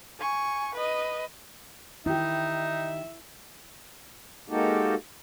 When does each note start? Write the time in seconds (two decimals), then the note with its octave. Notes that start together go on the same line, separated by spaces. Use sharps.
0.19 G#5 C#6
0.75 B4 D#5
2.06 D#3 D#4 E4 G4 E5
4.49 G#3 A#3 D#4 F#4 G4 A4